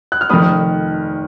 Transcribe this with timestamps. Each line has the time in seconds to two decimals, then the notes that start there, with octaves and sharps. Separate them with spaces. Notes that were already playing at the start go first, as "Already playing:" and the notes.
0.12 F#6
0.21 F6
0.30 F1 F2 D#3 B5 D#6